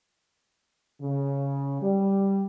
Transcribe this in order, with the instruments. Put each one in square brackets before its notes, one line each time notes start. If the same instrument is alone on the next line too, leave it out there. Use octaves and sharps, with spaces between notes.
[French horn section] C#3
G3